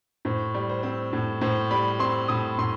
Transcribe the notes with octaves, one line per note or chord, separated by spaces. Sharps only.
A2 C5
G3
C5
C4
A2
A2 C5
G3 B5
C4 C6
A2 D#6
A2 C6